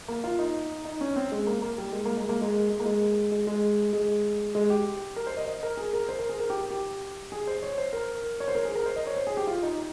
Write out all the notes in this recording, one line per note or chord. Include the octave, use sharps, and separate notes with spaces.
A#3
F4
D#4
D#4
C#4
C4
G#3
A#3
A#3
G3
G#3
A#3
G#3
A#3
G#3
G#3
A#3
G#3
G#3
G#3
G#3
G#3
G4
A#4
C5
D#5
D#5
A#4
G#4
A#4
C5
A#4
G#4
A#4
G4
G4
G#4
C5
C#5
C5
A#4
C#5
C5
A#4
G#4
A#4
C5
D#5
C#5
C5
G#4
G4
F4
D#4